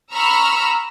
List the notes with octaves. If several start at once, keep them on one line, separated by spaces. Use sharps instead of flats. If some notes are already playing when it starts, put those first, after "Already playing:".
A#5 B5 C#6 E6 F6